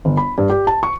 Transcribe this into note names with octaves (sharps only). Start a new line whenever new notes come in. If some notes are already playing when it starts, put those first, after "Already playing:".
G1
B5
G2
G4
A5
C#6